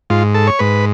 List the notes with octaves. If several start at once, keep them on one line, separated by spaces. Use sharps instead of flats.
G#2 F4
A4
C#5
G#2 B4